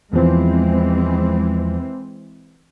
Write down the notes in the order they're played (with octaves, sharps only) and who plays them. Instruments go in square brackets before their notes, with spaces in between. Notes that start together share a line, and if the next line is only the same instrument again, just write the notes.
[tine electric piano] E2 F3 [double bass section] E3 G#3 C4